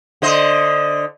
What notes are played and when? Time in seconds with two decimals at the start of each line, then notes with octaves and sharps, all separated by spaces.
0.22 D3 C5 D#5